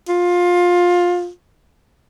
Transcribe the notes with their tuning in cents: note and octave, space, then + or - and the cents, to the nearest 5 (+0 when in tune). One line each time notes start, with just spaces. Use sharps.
F4 +20